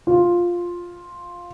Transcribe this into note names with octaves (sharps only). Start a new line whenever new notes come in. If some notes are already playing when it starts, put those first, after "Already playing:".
F4